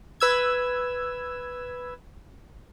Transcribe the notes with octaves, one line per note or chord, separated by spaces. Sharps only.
B4 E6 G#6